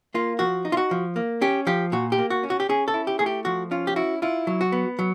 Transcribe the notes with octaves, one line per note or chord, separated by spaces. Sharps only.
A#3 F4
F3 F#4
D#4
F4
F#4
F3
A#3
C#4 G4
F3 G4
A#2 F#4
G4
A#3
F#4
C#4
F#4
G4
C#4 G#4
A4
E4
G4
A3 G#4
G4
F3 F#4
C#4 F4
G4
E4 F#4
E4 F4
F#3
F#4
B3
F#3